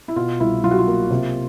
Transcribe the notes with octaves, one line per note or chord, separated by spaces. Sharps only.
E4
B2 F4
C2 E4
F#3 F4
F#4
F4
A#3
C3